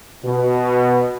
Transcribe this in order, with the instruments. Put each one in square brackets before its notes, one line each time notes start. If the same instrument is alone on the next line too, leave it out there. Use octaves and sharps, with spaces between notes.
[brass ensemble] B2